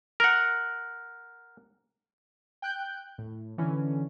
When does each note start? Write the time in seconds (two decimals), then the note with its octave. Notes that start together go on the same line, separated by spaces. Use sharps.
0.20 A#4 F#5
2.62 G5 F#6 G6
3.18 A2
3.58 D3 E3 C#4